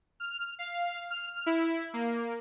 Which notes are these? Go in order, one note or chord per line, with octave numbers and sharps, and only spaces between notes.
F6
F5
F6
E4
A#3